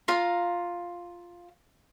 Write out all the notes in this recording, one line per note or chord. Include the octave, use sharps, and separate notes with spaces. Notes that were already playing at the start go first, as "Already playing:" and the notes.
F4 F5 A#5 C6